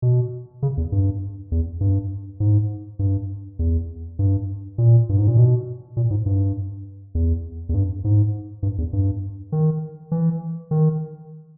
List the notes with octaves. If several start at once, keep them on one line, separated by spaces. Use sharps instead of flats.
B2
C#3
E2
G2
E2
G2
G#2
G2
E2
G2
A#2
G2
G#2
A#2
B2
A#2
G#2
G2
E2
E2
G2
G#2
G2
E2
G2
D#3
E3
D#3